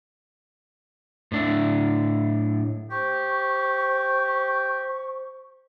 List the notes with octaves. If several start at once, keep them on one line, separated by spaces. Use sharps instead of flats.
A2 D4 E4
G4 C5 C#6